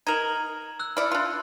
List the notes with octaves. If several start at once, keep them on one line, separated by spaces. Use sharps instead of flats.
D#4 A#4 G#6 E7 F#7
E6 F#6
E4 D5 F6 C#7
D4 F4